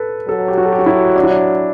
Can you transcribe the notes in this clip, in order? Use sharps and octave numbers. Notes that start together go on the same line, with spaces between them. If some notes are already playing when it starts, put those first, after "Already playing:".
Already playing: A4 B4
F#3 A4
G4
F#4
A4
G4
F#4
E4
D4
E4
D4